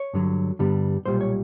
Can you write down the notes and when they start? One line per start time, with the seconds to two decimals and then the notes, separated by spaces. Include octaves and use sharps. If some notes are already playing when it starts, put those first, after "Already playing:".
Already playing: C#5
0.13 G2 D3 F#3
0.59 G2 D3 G3 B3
1.06 B1 A#2 G3 C5
1.21 C#5